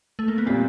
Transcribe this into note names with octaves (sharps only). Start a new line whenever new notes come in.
A3
A#3
B3
A#2 G3 A#3 C4